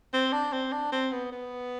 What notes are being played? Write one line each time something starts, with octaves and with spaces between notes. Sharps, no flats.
C4
D4
C4
D4
C4
B3
B3